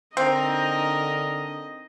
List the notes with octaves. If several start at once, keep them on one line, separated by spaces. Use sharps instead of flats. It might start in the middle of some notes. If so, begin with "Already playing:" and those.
D3 C4 D#4 A#4 D#5